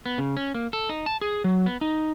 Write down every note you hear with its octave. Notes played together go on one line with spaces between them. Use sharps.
B3
C#3
C#4
A#3
A4
D#4
A5
G#4
F#3
B3
D#4